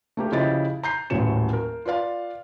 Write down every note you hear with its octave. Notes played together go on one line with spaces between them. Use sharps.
A3 A#3 G4
C#3 F3 E4 G4 D#5 A6
A#5 G6 C7
D#1 A1 A2 F#3 C#7 E7
A#4
F4 B4 D5 F5